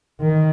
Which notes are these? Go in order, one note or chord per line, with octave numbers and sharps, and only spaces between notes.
D#3